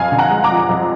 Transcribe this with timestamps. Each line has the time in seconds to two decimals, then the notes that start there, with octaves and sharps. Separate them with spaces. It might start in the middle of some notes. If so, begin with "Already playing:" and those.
Already playing: F2 F5 G#5
0.12 D3
0.18 F#5 A#5
0.31 G#3
0.44 A#5 D6
0.51 F3
0.69 F2